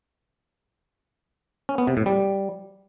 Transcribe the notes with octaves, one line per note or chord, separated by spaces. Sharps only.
C#4
B3
C3
A2
G3